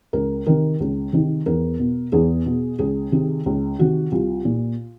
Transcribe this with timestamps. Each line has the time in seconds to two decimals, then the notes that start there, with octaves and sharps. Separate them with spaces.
0.13 C#2 A#4
0.46 C3 D#3 A#4
0.80 C#2
1.13 C3 D#3
1.46 E2 A#4
1.79 B2
2.12 E2 G#4
2.46 B2
2.79 C#2 G#4
3.12 C3 D#3
3.46 C#2
3.79 C3 D#3 F#4
4.12 C2 F4
4.45 A#2